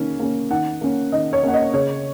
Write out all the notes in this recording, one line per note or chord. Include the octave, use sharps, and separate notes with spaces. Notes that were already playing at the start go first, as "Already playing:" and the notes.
Already playing: D#3 A#3 C#4
A#3 C#4
D#3 F#5
A#3 C#4
D#3 D#5
C#5
A#3 C#4 F#5
D#5
C#3 C#5